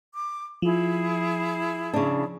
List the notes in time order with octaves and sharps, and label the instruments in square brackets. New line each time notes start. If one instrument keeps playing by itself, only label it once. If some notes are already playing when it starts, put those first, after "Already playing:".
[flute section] D6
[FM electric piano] F3 [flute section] E4 G#4
[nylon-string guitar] C#3 D4